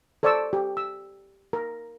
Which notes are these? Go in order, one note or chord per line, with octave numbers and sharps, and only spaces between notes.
A4 C5 D5 A5 C#6 E6
G4
E6
A#4